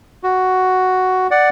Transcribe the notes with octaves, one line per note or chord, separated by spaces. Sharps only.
F#4
D5 F#5